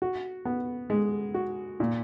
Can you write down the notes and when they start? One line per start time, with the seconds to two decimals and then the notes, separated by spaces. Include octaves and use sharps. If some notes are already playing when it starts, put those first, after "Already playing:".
0.02 F#4
0.45 B3
0.90 G#3
1.34 F#4
1.80 A#2